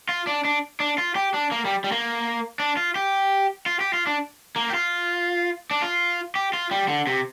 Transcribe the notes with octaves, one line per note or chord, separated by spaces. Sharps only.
F4
D4
D4
D4
F4
G4
D4
A#3
G3
G3
A#3
D4
F4
G4
F4
G4
F4
D4
A#3
G4
F4
D4
F4
G4
F4
G3
D3
C3